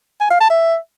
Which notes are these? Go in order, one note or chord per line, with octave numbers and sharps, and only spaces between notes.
G#5
F5
A5
E5